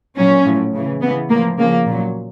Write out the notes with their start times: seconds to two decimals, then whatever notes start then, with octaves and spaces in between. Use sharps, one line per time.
0.17 A#2 F#3 C#4
0.45 A2 F3
0.74 C#3 E3
1.01 C#3 E3 B3
1.30 A2 F3 A#3
1.58 C#3 F3 A#3
1.86 A#2 F#3